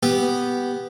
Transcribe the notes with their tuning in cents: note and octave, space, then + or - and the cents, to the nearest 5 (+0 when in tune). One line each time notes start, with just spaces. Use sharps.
B3 +0 G4 +0